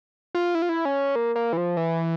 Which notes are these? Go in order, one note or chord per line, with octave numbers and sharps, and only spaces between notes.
F4
E4
F4
E4
C#4
A#3
A#3
E3
F3
E3